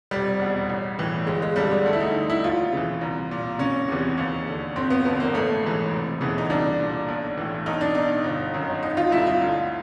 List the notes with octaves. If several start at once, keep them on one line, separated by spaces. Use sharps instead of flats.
F1 G3
E2 B2
A1
A2 E3
G1 G#3
G#3
G2 D3 G3
G#3
D2 A3
E4
D#4
D3
E4
D#2 F4
C#3 E3
C2
A#2
F#1 C#4
E2 C3 E3
D#2
D3
G1 C4
B3
F2 D3 B3
A#3
A1 A3
G#2 E3
F1
E2 C#3 E3
D#4
C2 D4
A#2
B1
A2 E3
B1 D#4
D4
B2 D#4
G1
F#2 D#3
G#1 D#4
F4
G2 D3 E4
F4
D2